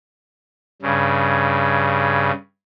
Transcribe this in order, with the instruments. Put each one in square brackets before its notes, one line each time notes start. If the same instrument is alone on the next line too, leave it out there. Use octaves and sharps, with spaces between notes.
[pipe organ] G2 C#3